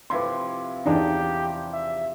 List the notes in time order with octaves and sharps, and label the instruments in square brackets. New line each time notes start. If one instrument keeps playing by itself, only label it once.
[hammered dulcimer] C3 F3 E4 [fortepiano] B4 C6
[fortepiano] E2 D4 D#4 [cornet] G4
[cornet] E5